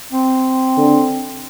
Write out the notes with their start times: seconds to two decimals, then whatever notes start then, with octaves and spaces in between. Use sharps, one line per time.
0.13 C4
0.77 D3